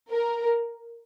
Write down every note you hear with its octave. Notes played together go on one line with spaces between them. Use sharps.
A#4